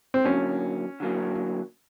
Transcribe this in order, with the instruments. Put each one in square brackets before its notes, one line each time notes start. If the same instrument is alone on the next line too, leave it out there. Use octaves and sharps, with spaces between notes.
[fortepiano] C4
[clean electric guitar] D3 F#3 A#3 [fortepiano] C#4
[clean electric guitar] D3 F#3 A#3